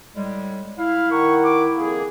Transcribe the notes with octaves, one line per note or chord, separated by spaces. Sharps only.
A2 G3 G#3
E4 F5
D#3 A#4 F#5 C#6
D6
F2 A#3 G#4